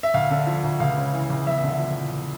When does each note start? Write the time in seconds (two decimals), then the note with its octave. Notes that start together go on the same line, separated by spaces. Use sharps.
0.03 E5
0.14 D2 F5
0.31 D3
0.47 F3
0.64 D2
0.80 C#2 F5
0.97 C#3
1.13 E3
1.30 C#2
1.47 E2 E5
1.58 E5
1.63 D3
1.68 E5
1.79 F3
1.96 E2